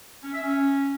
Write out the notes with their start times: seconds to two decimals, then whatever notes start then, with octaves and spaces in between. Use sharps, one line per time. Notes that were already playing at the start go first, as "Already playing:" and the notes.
0.23 C#4
0.33 E5
0.43 C#4